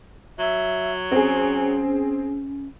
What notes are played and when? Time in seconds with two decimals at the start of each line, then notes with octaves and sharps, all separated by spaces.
0.39 F#3 E5
1.12 C4 C#4 G#4